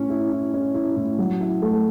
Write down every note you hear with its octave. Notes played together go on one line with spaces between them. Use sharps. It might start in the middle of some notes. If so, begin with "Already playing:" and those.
Already playing: A2 C#4
E4
E4
C#4
E4
A2
F#3
E4
A3